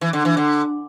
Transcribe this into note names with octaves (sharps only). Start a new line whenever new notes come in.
E3
D3
E3
D3